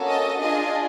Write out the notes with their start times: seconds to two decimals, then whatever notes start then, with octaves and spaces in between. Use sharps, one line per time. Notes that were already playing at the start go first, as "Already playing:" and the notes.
Already playing: A#3 C#4 F#4 A4
0.08 D#5
0.41 D4 F4 G#4 D#5